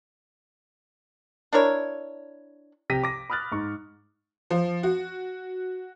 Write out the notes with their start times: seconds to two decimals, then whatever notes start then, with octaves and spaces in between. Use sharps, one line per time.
1.52 D4 E4 A#4 C#5
2.90 C3 G4 A#6 B6 D#7
3.03 D6 A#6
3.30 B5 D#6 F6 F#6 A6
3.52 G#2 C#6
4.50 F3
4.83 F#4